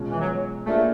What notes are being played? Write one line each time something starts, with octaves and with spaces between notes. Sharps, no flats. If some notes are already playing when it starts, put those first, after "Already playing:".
Already playing: B2 G#3 C#4 F4
E3
F#3
A3 A#3 D4 F4 G#4